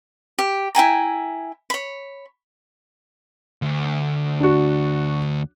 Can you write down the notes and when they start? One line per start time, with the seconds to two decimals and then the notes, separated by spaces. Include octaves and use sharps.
0.39 G4
0.75 E4 G5 G#5 A#5
1.70 C#5 B5
3.62 D2
4.40 D4 F#4